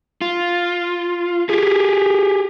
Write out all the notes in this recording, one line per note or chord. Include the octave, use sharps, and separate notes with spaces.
F4
G4 G#4